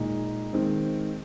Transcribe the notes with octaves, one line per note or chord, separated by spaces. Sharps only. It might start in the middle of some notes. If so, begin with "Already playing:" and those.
Already playing: A#2 G#3 D#4
D#3 G#3 C4